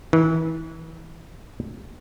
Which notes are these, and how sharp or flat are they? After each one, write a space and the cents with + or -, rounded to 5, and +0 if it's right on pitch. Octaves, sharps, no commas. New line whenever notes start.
E3 -30